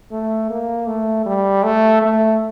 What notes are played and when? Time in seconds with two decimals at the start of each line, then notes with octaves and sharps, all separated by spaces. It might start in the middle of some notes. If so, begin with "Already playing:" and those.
0.12 A3
0.50 A#3
0.87 A3
1.26 G3
1.64 A3
2.02 A3